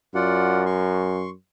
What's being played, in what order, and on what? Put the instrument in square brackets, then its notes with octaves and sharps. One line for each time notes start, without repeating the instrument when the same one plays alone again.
[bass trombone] F#2 [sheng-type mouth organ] F4 D5 F#5
[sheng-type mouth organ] C6 C#6